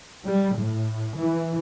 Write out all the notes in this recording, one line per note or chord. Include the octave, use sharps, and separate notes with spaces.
G3
A2
E3